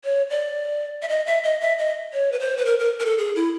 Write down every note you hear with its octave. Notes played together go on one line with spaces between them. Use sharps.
C#5
D5
E5
D#5
E5
D#5
E5
D#5
C#5
B4
C5
B4
A#4
A#4
A#4
A4
G#4
E4